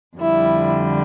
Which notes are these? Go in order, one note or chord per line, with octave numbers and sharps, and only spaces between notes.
F2 D3 G3 E4